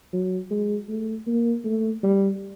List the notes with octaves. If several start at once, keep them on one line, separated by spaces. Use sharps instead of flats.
F#3
G#3
A3
A#3
A3
G3